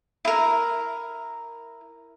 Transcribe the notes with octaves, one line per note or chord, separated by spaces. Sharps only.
E4 A#4